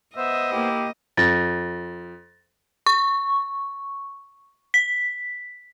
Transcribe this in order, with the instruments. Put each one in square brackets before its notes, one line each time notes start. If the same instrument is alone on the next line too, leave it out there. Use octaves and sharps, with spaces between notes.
[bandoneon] B3 C5 [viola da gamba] D#5 [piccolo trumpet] E5
[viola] A#3 E4 [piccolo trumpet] G4
[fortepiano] F2 [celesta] A6 A#6
[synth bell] C#6
B6